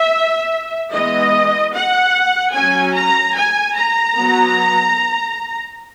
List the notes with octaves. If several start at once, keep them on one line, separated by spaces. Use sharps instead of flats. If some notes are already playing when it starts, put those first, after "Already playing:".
Already playing: E5
E3 G#3 B3 D#5
F#5
F#3 C#4 G#5
A#5
G#5
A#5
F#3 B3